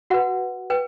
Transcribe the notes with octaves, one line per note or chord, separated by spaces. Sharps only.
F#4 B4 F#5
B4 G5